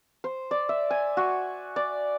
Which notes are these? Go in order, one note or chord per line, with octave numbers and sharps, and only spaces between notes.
C5
D5
E5
G#5
F#4
D5